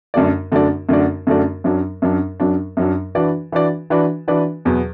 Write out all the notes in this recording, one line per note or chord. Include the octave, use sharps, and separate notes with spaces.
F#2 D3 A3 F#4 D5
F#2 D3 A3 F#4 D5
F#2 D3 A3 F#4 D5
F#2 D3 A3 F#4 D5
F#2 F#3 D4
F#2 F#3 D4
F#2 F#3 D4
F#2 F#3 D4
E3 D4 F#4 B4 D5
E3 D4 F#4 B4 D5
E3 D4 F#4 B4 D5
E3 D4 F#4 B4 D5
E2 B2 F#3 B3